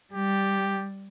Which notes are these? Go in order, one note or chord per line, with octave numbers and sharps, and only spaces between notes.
G3 G4